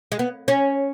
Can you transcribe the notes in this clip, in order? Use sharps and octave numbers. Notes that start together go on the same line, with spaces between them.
G#3
B3
C#4